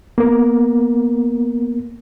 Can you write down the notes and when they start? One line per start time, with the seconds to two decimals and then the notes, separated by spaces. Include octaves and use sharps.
0.18 A#3 B3 A#4